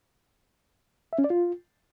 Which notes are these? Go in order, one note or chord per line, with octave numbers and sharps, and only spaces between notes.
E5
C#4
D5
F4